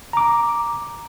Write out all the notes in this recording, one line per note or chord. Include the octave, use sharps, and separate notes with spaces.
A#5 D6